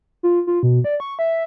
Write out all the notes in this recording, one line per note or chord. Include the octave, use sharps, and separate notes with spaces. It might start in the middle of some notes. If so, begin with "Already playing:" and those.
F4
F4
B2
D5
C#6
E5